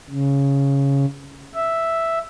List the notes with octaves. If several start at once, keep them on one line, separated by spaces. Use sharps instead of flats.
C#3
E5